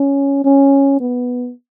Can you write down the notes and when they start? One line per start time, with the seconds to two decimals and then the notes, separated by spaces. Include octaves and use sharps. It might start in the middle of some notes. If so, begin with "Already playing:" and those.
Already playing: C#4
0.44 C#4
1.00 B3